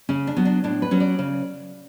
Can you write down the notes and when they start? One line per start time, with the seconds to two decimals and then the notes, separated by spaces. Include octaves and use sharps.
0.09 C#3 C#4
0.27 D4
0.37 F#3 B3
0.45 D4
0.64 A2 D4
0.82 B4
0.91 F#3 C#4
1.00 D5
1.19 C#3